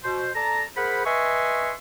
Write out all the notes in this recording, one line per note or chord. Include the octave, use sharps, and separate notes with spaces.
B2 C5
A4 D5 A5 A#5
G#4 A#4 C5 F#5 B5
B4 D#5 E5 G#5 C6 C#6